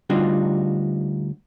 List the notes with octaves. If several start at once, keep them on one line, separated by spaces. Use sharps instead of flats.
D2 G3 D4 D#4 F4 F#4